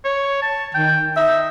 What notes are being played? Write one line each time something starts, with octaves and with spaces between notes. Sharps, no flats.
C#5
A5
D#3 G5
D#4 E5